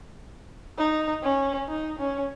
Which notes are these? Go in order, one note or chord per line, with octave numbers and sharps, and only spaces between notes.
D#4
C#4
D#4
C#4